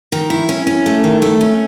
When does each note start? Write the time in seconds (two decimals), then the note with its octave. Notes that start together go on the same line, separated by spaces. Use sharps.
0.12 D#3
0.30 E4
0.49 C#4
0.67 C#4
0.86 A3
1.04 D#3
1.22 A3
1.41 C#4